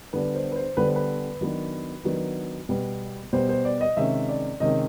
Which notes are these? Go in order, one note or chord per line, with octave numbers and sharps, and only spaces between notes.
D3 G3 B3 D4 B4
C5
B4
C5
D3 G3 B3 D4 B4
C5
B4
D#3 F#3 B3 D4
D#3 F#3 B3 D4
B2 G3 B3
B2 G3 B3 C5
C5
D5
D#5
C3 D#3 G#3 C#4 E5
D5
C3 D#3 G#3 C#4 D#5